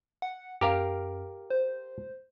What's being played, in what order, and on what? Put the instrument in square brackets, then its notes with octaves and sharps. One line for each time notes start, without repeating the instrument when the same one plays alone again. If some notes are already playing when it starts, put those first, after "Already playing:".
[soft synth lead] F#5
[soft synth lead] F#2 [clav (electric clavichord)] G4 A#4 F5
[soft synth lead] C5